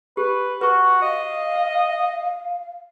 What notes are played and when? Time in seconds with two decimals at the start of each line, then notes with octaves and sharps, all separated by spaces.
0.17 G4 B4
0.61 F#4 B4 C#6
1.02 D#5 F5